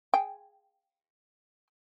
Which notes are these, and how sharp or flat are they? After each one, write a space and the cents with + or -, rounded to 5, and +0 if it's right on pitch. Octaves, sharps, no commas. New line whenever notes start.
G#4 +0 G5 -15